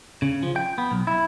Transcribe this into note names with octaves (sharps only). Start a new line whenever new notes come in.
C#3
F3
G5
B3
B1
E4